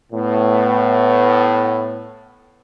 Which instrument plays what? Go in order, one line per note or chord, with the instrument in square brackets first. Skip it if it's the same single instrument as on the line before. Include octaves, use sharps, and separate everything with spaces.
[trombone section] A2 B3